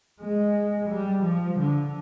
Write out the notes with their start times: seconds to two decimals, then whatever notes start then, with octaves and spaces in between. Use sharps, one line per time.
0.21 G#3
0.90 G3
1.24 F3
1.59 D3